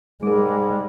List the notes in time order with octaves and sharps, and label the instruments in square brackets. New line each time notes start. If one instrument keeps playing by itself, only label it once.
[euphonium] G#2 [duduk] G3 [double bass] G#3 [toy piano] G#4 A#4